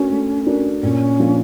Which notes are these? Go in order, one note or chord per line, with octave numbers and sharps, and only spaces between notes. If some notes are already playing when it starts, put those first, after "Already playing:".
Already playing: A3 C#4 D4 F#4 A#4
A3
D4 F#4 A#4
A#2 C#4
F3 A#3 D4 F4